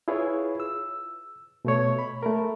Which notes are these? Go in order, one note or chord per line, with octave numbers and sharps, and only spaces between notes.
E4 F4 G#4 B4 C#5
E6
B2 A3 C#5
B5
A3 A#4